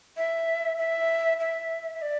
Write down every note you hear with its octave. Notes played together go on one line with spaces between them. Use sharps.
E5
E5
E5
E5
D5